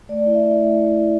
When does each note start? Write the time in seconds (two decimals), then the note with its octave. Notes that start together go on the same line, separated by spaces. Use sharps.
0.09 A3 D5
0.26 E4
0.35 E5
0.44 E4
0.61 A3
0.78 A3
0.95 E4